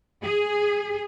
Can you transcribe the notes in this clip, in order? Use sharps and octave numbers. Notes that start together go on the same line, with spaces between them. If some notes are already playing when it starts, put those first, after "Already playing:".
G#4